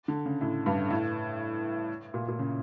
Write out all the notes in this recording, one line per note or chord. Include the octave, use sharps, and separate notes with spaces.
D3
C#3
A2
G2
A2
A#2
A#2
C#3